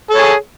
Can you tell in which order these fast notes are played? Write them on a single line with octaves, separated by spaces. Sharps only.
A4 C#5 G#4